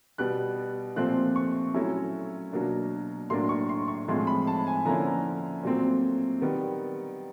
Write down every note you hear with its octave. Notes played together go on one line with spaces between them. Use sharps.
B2 G3 B3 F#6
A#2 F3 A3 C4 F#6
C#6
F#3 A3 C#4 E4
B2 F#3 A#3 D4
A2 F#3 A#3 D4 C6
C#6
C6
C#6
A2 F3 G#3 C4 C6
B5
A5
G#5
D3 F3 A#3 C#4 E4 A#5
A#2 F#3 A3 C4
D#3 G3 B3